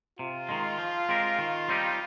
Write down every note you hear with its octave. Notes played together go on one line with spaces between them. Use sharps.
C3 F4
D#3 G#3
F3
G#3 C4 G4 A#4
D#3
G3 C4 D#4 G4